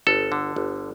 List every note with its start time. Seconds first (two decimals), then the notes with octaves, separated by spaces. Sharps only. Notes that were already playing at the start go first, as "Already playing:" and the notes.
0.07 G1 A4
0.32 D3
0.56 G1